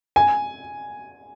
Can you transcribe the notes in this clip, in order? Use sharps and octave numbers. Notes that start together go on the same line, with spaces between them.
G#5